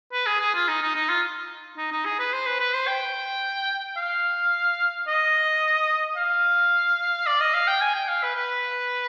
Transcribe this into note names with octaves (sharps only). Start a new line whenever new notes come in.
B4
G#4
G#4
F4
D#4
D#4
D#4
F4
D#4
D#4
G#4
B4
C5
B4
B4
C5
G5
F5
D#5
F5
D5
D#5
F5
G5
G#5
G5
F5
B4
B4